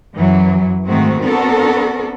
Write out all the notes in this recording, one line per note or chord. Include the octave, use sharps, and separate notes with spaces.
F#2 E3 F#3
G#2 D#3 G#3 A3 C4 F#4
B3 C4 D4 F#4 A4 A#4